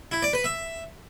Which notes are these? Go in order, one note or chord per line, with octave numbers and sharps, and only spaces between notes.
E4
D5
B4
E5